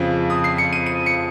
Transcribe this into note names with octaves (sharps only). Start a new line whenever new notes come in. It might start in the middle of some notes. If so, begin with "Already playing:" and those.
Already playing: F2 C#3 F3
D#6
C7
C#7
D#7
D#7
C#7